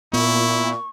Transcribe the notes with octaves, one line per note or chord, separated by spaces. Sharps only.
A#2 B3 E4 C#6